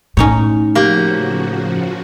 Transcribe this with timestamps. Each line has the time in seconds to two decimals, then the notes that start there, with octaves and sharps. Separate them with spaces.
0.17 A2 C#4 D#4 C#5
0.75 C#3 F3 A#3 F#4 G4